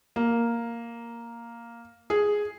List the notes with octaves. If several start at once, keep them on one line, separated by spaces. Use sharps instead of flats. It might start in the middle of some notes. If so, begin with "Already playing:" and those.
A#3
G#4